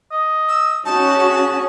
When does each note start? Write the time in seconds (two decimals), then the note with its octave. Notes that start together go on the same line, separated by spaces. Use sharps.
0.11 D#5
0.49 E6
0.85 C#4 D#4 F#4 A5
1.17 G#4